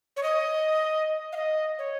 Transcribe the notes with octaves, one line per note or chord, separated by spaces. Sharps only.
C#5
D#5
F5
D#5
C#5